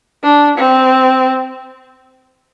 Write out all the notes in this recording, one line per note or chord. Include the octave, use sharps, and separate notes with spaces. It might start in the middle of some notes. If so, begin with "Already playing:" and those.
D4
C4